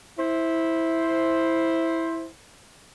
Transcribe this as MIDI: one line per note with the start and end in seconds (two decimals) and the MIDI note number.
0.18 2.27 64
0.18 2.27 72